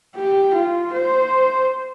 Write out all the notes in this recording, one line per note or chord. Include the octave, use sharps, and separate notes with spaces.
G4
F4
C5